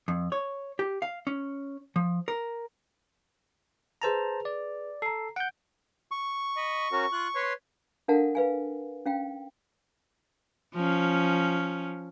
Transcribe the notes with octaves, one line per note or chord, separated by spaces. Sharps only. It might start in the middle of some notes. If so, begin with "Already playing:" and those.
F2
C#5
G4
F5
C#4
F3
A#4
G#4 B4 C5 A5 A#5 F7
D5
A4 A#5 C7
F#5 G6 D7
C#6
D#5 B5
C#4 F#4 A#4
F4 F#6
B4 C#5 C6
D4 A4 A#4 F5 F#5 A5
B4 F5 G#5
C#4 F5 G5
F3 C#4